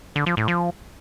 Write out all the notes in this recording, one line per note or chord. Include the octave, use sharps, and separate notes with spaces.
D3
F3
A2
F3